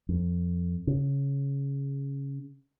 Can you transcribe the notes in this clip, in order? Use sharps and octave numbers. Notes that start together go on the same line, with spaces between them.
F2
C#3